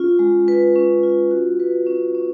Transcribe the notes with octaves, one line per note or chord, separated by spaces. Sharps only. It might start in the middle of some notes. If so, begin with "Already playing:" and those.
Already playing: C#4 F4
G#3
B4
C#4
F4
F#4
B4
C#4
C#4